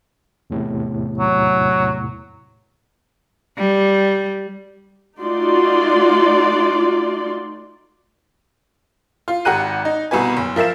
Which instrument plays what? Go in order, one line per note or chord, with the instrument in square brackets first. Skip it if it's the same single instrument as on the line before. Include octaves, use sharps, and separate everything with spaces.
[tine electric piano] E2 A2 C3
[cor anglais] F#3
[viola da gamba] G3
[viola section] A3 D#4 F4 F#4 D5 C6
[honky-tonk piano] F4
G#1 G4 F#5 A#5 F#6 D#7
D#4
C2 B2 B4 G#5
F#1
F3 A#4 E5 F5 E7